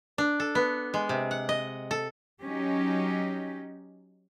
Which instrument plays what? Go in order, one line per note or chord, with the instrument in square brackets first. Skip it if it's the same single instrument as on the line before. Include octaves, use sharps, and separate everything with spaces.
[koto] D4
A4
B3
G#3
C3
F#5
D#5
A4
[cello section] F#3 C#4 D#4 G4